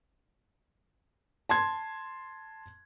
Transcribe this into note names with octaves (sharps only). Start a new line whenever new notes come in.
A5 C6 G#6